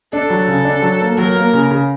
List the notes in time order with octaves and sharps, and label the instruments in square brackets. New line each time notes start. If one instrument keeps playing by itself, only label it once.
[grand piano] D4 [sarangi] A4
[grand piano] F#3
C#3
D4
F#3
A#3
[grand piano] F#3 [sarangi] A#4
[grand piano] A#3
C#3
C#3